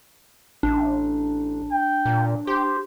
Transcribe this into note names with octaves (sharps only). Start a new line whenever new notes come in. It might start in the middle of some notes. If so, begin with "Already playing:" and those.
A1 D4
G5
A#2
G4 C5